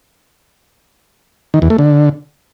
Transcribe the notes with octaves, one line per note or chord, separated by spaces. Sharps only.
D#3
E2
A3
D3